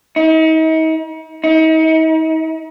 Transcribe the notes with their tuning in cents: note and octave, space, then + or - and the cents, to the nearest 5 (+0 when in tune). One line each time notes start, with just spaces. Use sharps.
D#4 +40
D#4 +40